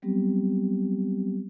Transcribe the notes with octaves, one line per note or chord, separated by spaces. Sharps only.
F#3 G3 B3 C4 G4